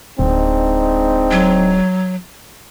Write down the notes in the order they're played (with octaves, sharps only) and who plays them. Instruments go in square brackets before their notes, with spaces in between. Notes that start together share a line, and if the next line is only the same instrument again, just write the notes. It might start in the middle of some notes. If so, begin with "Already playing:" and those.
[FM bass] D1 [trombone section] G#3 D4 D#4 [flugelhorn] C4
[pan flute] F#3